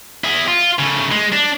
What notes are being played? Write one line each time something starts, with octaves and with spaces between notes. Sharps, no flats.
E4 G#4
F4
C#3 A3
G#3
D4